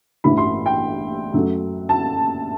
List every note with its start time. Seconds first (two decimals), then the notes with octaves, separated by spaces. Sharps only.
0.24 A1 G2 E3 B5
0.38 C6
0.66 G5
1.34 F#2 F#3 A3
1.89 A5